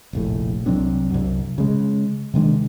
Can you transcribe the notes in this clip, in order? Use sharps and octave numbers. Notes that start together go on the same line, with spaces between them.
F1 A#1 A2
C2 F#3 C4 D4
C2 F#2
C#3 G#3
C3 D#3 G#3 D4